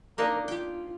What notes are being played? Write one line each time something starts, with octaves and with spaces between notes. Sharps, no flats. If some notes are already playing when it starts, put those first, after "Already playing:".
A#3 D4 D#4 A#4
F4 G4 G5